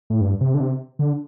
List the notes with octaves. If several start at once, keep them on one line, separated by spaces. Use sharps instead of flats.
A2
G2
C3
D3
C3
D3